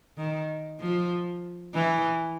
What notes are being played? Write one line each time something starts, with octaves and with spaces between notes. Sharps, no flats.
D#3
F3
E3